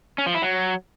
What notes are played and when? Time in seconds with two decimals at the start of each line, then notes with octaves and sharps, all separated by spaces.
0.18 C#4
0.26 F3
0.34 E4
0.42 F#3